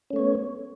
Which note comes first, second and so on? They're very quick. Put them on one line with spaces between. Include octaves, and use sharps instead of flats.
C#4 A3 C#5 B3